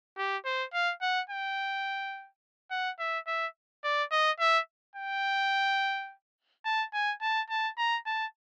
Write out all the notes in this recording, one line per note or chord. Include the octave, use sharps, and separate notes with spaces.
G4
C5
F5
F#5
G5
F#5
E5
E5
D5
D#5
E5
G5
A5
G#5
A5
A5
A#5
A5